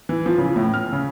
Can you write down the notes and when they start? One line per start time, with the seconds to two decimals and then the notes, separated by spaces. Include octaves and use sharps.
0.09 E3
0.26 F3
0.38 C#3
0.56 A2
0.74 F6
0.93 C#3